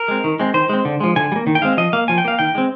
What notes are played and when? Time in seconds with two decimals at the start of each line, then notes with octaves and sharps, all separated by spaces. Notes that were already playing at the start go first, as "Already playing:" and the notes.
Already playing: A#4
0.08 G#3 C4
0.24 D#3
0.40 G#3 C4
0.54 D#3 C5
0.69 G#3 C4
0.85 D3
1.00 F3 G#3
1.16 D3 G#5
1.32 G3
1.36 A#3
1.47 D#3
1.55 G5
1.62 G#3 C4 F5
1.77 F3 D#5
1.93 A#3 F5
2.08 F3 G#5
2.18 G5
2.25 A#3 F5
2.39 D#3 G5
2.55 G#3 C4